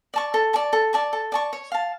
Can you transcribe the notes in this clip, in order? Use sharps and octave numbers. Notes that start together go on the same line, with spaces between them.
D5 A5 C#6
A4
D5 A5 C#6
A4
D5 A5 C#6
A4
D5 A5 C#6
C#5
F5 A5